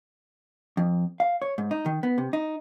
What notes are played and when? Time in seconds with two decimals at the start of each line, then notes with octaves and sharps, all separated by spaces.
0.77 F2
1.20 F5
1.42 C#5
1.58 G#2
1.71 D#4
1.86 D#3
2.03 B3
2.18 C3
2.33 D#4